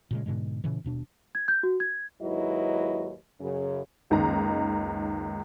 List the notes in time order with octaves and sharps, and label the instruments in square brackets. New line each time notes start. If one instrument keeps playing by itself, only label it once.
[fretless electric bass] A#2 C#3 G#3
G#2 B2 D3 G#3
A#2 C#3 E3
D#1 B2 D4
[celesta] G#6
G6
F#4
G#6
[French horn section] D#2 G#2 F#3 E4 B4 D#5
F#2 C#3
[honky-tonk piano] F#1 C#2 D#3 D#4 A#5